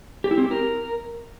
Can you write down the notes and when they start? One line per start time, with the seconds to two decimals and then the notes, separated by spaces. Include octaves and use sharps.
0.24 G4
0.31 E4
0.38 C4
0.44 G4
0.51 A#4